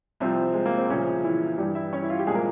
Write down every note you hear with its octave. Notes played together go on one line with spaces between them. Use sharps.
C2 C3 F3 C4
G#3
A#3
C4
C2 A#2 C#3 F3 C#4
E3 E4
G2 E3 G3 G4
E4 E5
C#4 C#5
E4
F4
G4
C2 A#2 F3 G#3 G#4
A#3 A#4